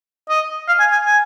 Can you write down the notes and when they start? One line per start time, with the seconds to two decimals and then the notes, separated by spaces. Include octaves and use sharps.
0.29 D#5
0.68 F5
0.80 G#5
0.92 G#5
1.05 G#5